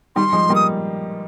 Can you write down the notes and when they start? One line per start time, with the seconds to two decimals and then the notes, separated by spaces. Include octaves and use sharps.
0.16 D#3 G3 C6
0.33 F3 G#3
0.49 G3 A#3
0.55 D#6